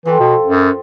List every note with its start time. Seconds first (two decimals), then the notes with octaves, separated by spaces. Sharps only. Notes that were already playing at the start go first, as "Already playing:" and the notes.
0.05 E3 F3 A4 G5
0.19 B2
0.46 F#2